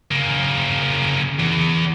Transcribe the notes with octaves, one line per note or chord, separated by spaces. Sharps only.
C#3 A#3
E2